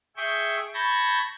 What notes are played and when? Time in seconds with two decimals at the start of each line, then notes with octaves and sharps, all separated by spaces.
0.17 G#4 E5 G5 C#6
0.74 A5 B5 C#6 G6 G#6 A#6